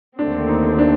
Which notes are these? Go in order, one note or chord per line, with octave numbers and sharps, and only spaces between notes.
D#2 D3 A3 C4 D4
D#4
D4